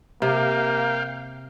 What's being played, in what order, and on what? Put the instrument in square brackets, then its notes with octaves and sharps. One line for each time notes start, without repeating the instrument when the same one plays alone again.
[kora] C3 [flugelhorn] A#3 [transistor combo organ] F5 G5